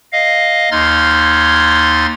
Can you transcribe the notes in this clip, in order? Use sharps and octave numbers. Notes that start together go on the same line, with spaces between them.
D#5 F5
D#2 D#4 C6 F6 G#6 A6